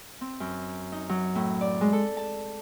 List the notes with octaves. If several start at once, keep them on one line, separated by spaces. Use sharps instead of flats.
C4
F#2
D#4
F#3
A2
D5
G#3
A4
A5